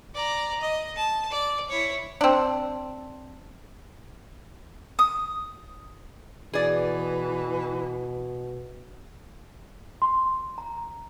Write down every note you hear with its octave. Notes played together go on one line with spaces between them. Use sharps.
D5 A#5
D#5
A5
D5
E4 C#5
C4 D4
D#6
B2 E3 G#4 D5
C6
A#5